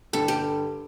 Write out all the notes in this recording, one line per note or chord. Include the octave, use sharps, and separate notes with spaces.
G2 D3 G3 A4
G4